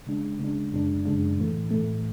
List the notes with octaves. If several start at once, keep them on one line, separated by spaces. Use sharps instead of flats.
C#3 G#3 D4
C#3 G#3 D4
F#2 C#3 G#3 D4
F#2 C#3 G#3 D4
A2 E3 A3
A2 E3 A3